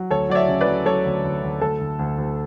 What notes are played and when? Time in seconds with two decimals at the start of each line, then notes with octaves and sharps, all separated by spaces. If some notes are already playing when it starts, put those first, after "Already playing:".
Already playing: F#3
0.10 D2 A4 C#5
0.30 F#3 D5
0.35 C#5 E5
0.48 C#3
0.61 B4 D5
0.67 F#3
0.85 F#3 A4 C#5
1.05 D2
1.24 D2
1.43 D2
1.61 D2 A4
1.80 D2
1.99 D2
2.18 D2